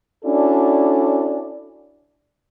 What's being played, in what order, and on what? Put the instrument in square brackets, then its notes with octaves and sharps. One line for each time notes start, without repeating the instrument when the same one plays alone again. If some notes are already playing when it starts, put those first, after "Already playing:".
[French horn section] C#4 D4 E4 F#4 A4 D5